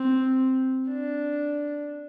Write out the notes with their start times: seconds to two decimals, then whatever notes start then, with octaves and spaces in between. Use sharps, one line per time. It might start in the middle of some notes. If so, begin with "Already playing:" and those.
Already playing: C4
0.89 D4